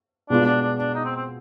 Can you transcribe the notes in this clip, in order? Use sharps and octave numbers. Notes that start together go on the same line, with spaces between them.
B2 G#3 B3 D4 F4
D4
D4
D4
D#4
C4
C4